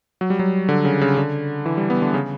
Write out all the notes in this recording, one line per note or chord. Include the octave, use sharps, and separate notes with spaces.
F#3
G3
F#3
D3
C#3
C#3
D3
E3
G3
B3
D3
C#3